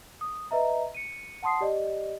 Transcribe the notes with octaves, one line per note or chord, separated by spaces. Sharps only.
D#6
B4 D#5 E5 A#5
C#7 D#7
F#5 A5 C6 D#6 C7
G4 D5 D#5